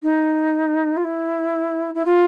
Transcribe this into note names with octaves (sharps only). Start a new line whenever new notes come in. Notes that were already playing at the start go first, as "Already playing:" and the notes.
D#4
F4
E4
E4
F4